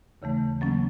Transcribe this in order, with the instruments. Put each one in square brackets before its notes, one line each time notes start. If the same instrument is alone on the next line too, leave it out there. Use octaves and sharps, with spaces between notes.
[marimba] D#2 C#3 E3 A3
F#3 A#3 C#4